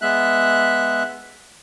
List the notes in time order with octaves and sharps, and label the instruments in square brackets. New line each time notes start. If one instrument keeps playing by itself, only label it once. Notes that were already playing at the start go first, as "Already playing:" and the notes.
[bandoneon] G#3 B3 E5 F#6